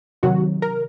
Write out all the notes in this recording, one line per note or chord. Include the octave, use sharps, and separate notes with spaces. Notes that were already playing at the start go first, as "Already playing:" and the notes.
C3 D#3 F#3 F#4
A#4